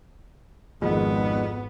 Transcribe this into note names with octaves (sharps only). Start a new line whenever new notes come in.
G#1 F2 G#2 D#3 B3